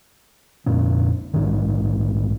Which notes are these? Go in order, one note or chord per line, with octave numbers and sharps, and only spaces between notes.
F2 A#2 C#4
A#1 G#2 D#3